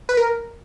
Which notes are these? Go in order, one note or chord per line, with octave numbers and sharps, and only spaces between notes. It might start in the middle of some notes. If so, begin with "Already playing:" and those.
B4
A#4